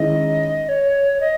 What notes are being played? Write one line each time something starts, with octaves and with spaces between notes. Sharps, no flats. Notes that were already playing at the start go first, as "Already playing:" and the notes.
Already playing: D#3 G#3 C#4 E4 D#5
C#5
D#5